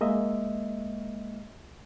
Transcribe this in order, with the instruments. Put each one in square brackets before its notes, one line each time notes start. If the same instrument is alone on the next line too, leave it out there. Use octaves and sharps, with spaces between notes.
[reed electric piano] G#3 A#3 D#5 E5